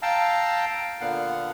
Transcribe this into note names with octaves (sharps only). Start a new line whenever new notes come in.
F5 G5 A5 A#5 E6
A#2 D3 B3 F5 F#5